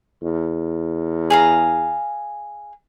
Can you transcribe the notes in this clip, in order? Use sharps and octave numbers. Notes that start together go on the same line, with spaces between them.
E2
G#4 F5 A#5